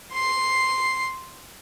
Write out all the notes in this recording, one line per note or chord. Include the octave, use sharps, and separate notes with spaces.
C6 C7